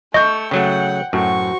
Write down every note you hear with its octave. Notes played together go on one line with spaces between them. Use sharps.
A3 D#5 C#6 E6 G6
C#3 F#3 A3 F#5 G5
F#2 A2 F#4 C5 C#6